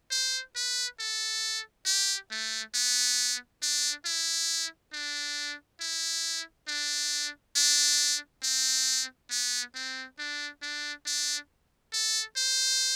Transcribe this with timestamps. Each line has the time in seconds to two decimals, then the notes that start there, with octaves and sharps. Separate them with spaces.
0.11 C5
0.56 B4
0.99 A4
1.86 G4
2.31 A3
2.75 B3
3.62 D4
4.05 E4
4.93 D4
5.80 E4
6.68 D4
7.56 D4
8.43 C4
9.31 B3
9.75 C4
10.19 D4
10.62 D4
11.06 D4
11.93 A4
12.37 C5